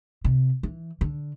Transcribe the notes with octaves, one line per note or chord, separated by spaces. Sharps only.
C3
E3
D3